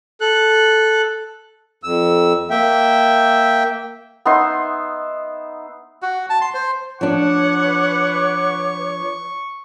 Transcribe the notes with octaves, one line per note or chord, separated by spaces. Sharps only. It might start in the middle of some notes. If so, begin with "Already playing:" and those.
A4 F#6
F2 E6
A#3 E5 G5
B3 D#4 E5 C6
F#4
A5
C6
C5
F3 D4 B4 C#5 F#5 C#6 D6